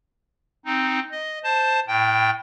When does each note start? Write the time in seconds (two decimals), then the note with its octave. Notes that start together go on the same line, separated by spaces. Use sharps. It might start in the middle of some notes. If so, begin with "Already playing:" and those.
0.66 C4 D#4
1.11 D#5
1.44 C5 A5
1.88 A2 G5